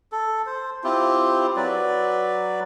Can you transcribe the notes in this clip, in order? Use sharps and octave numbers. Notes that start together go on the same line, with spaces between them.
A4
C5
C4 E4 F4 G4
F#3 B4 D5